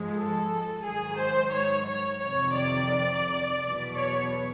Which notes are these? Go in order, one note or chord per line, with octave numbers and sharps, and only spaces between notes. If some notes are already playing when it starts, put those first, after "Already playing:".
Already playing: G#2 F3 G#3
A4
G#2 D#3 F#3 G#4
C5
C#5
C#5
F2 C3 D#3 C#5
D5
E2 B2 F#3
C#5